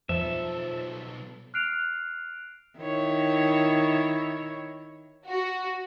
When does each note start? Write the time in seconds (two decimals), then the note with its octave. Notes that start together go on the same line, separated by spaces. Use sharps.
0.09 B1 F2 F3 A4 E5
1.54 F6 F#6 C7 D7 F7
2.78 D#3 E4 C#5
5.26 F#4